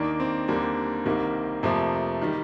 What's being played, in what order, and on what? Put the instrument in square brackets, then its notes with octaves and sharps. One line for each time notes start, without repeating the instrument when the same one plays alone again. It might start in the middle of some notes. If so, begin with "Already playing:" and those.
Already playing: [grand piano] D#2 D#3 A#3 D4
C4
D#2 D3 G3 A#3
C2 C3 D#3 G3 A#3
F2 C3 F3 A3 A#3
D#3 G3